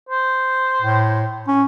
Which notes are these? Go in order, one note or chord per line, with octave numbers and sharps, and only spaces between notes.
C5
A2
C#4